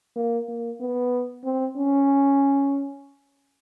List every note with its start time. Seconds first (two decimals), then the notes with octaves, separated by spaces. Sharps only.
0.16 A#3
0.48 A#3
0.80 B3
1.44 C4
1.76 C#4